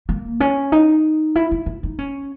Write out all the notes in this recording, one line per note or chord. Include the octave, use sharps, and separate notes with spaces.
A#3
C#4
D#4
E4
E4
E4
D#4
C#4